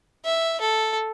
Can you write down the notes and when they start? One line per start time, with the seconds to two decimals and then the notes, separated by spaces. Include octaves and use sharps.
0.25 E5
0.61 A4